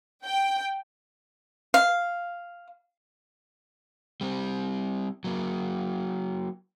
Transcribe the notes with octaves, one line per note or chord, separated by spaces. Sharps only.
G5
F5
G3 C4
F#3 A#3